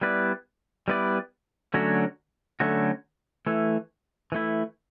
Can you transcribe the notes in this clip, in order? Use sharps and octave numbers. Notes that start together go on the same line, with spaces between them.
G3 B3 E4 B4 D5
G3 B3 E4 B4 D5
D3 F#3 A3 C#4 F#4
D3 F#3 A3 C#4 F#4
E3 A3 E4
E3 A3 E4